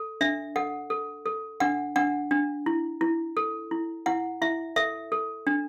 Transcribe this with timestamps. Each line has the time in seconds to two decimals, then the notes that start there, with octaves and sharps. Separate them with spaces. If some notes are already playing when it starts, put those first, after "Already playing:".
Already playing: A4
0.21 D4 E5
0.56 A4 F#5
0.90 A4
1.26 A4
1.60 D4 F#5
1.96 D4 F#5
2.31 D4
2.66 E4
3.01 E4
3.37 A4
3.71 E4
4.06 E4 F#5
4.42 E4 E5
4.76 A4 E5
5.12 A4
5.47 D4